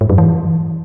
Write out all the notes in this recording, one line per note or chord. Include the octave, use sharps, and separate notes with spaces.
G#2
F#2
E3